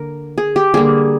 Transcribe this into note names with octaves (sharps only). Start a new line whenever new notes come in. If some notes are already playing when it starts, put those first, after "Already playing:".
Already playing: D3 A#3 A#4
G#4
G4
D3 G3 A#3 G#4